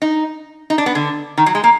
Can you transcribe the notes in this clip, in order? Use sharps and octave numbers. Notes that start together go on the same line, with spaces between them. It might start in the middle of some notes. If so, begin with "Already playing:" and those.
D#4
D#4
D4
B3
D3
D#3
F#3
G#3
A#3